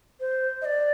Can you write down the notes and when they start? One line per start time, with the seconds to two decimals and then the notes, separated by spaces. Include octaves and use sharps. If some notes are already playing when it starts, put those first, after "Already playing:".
0.20 C5
0.62 D#5
0.65 D5